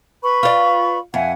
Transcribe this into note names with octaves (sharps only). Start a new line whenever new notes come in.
B4 B5 C#6
F4 D5
F2 E5 F#5 G#5